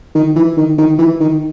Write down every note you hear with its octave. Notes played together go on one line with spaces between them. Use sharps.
D#3
E3
D#3
D#3
E3
D#3